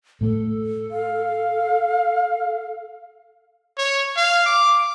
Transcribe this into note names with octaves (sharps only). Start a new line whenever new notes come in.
A2 A3 A4
F5
C#5
F5
D6